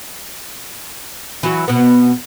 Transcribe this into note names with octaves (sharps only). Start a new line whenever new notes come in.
E3 F#3 F#4
B2 B3